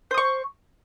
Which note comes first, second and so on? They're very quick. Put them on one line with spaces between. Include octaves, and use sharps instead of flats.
C5 D#6 C#6